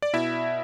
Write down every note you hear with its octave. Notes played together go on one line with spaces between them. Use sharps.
D5
B2 E4 E5